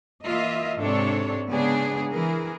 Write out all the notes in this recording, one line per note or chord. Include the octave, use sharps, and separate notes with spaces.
E3 A#3 F4 D#5 E5
G#2 C3 D4 A4 C#5
C#3 G#3 B3 D4 G#4
E3 G#4 A#4